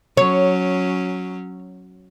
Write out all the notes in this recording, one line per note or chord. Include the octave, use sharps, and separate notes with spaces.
F#3 C#4 C#5